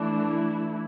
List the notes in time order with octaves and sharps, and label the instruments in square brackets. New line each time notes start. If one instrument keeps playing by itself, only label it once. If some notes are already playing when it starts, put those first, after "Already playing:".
Already playing: [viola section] E3 A3 D4
E4